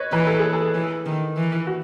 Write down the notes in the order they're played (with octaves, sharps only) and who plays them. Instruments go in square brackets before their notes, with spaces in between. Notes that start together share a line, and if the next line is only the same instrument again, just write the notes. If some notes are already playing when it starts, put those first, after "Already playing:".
Already playing: [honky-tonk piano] B4 C#5 D#5
[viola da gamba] E3 [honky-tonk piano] B4
[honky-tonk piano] A4
G#4
A4
[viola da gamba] E3
D#3
E3
[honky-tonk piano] F#4